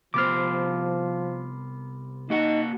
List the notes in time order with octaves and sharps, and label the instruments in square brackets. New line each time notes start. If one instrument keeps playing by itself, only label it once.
[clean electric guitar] C2 B3 C5 [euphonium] F3 [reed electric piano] D6 F6
[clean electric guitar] A#3 F#4 F#5 [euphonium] D#4